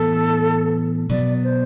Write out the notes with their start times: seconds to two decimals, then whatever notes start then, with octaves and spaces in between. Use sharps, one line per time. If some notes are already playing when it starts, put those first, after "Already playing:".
Already playing: A2 E3 B3 A4
1.09 B2 F#3 B3 D5
1.43 C5